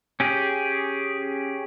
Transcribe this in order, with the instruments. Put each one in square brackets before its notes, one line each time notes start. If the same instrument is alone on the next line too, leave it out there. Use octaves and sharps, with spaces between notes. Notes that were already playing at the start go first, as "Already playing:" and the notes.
[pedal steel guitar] C#4 G4 G#4